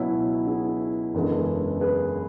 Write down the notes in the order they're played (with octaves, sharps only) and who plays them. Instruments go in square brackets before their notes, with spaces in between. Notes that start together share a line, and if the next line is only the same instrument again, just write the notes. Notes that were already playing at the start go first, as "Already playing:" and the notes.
Already playing: [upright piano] C#2 B2 F#3 C#4 E4
E4 G#4
F#1 E2 D3 G#3
G#4 B4